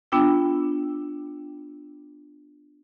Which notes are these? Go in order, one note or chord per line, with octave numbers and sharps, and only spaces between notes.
B3 D4 F4 G5 E6